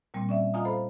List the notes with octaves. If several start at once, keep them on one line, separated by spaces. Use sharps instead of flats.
A#2 G3 A#3 C4
C#4 D5 E5
F4 D#5 F5 G#5 A#5 D#6
A4 C5 F5 B5